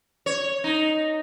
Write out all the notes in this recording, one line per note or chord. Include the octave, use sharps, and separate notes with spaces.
C#5
D#4